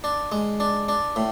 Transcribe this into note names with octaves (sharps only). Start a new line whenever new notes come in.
D4
G#3
D4
D4
A2